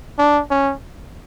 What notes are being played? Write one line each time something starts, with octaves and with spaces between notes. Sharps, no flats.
D4
C#4